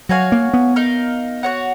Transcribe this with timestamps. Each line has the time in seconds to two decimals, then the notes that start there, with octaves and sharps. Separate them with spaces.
0.09 F#3 F#4 C#5 F5 G#5
0.32 A#3
0.53 B3
0.76 D#4 A#4 F5
1.43 F#4 C#5 F#5